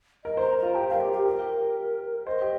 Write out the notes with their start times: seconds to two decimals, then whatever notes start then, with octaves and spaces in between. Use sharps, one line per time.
0.24 A#4 D#5
0.37 C5 A#5
0.58 F4 A#5
0.75 G4 G5
0.88 A#4 F5
1.01 G4
1.12 G4
1.26 G4 A#4
2.26 C5 D#5
2.42 G4